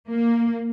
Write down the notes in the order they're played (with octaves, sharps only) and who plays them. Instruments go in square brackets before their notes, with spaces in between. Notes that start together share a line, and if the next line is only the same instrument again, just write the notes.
[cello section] A#3